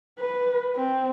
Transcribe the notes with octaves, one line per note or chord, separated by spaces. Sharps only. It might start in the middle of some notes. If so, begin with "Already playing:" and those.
B4
C4